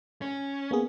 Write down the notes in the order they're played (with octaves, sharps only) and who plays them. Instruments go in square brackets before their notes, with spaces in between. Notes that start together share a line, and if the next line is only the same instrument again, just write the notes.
[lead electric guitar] C#4
[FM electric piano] A#3 B3 G#4